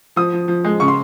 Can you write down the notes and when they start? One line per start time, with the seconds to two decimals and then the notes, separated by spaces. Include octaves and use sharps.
0.16 F3 D#6
0.33 F3
0.48 F3
0.65 G#3
0.80 C#3 C#6
0.88 C6